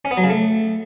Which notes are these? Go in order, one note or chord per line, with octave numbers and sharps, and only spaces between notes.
C#4
B3
F#3
C#3
A3